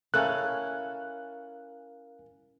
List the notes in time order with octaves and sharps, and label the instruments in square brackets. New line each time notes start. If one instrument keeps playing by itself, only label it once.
[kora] C#4 E4 A4 [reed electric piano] A#4 F5 G#5 [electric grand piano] F#6